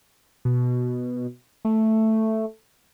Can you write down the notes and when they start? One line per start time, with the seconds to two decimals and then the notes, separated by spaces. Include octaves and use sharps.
0.45 B2
1.65 A3